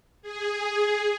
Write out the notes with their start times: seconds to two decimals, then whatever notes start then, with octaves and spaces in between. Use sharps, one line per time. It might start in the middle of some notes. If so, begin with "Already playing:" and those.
0.22 G#4